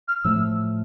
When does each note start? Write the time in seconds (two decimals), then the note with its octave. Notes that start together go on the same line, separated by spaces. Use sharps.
0.08 F6
0.24 A2 F3 A3 E6